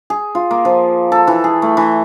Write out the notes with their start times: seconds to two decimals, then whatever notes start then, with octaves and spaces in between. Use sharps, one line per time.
0.10 G#4
0.35 F4
0.51 A#3
0.65 F3
1.12 A4
1.27 E3
1.44 G#4
1.62 A3
1.77 E3